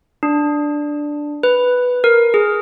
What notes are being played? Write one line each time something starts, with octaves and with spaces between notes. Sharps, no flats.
D4
B4
A#4
G#4